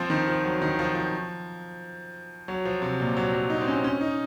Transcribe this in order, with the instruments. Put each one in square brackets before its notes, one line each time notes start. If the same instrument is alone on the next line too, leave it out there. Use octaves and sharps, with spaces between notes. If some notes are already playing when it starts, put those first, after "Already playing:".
Already playing: [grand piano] F3 C4
D#3
F3
F#3
D#3
F3
F3
F#3
F3
C3
A#2
F#3
F#3
D#4
C4
C#4
C#4
D#4